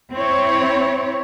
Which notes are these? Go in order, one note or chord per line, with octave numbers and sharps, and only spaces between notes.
C4 E4 C#5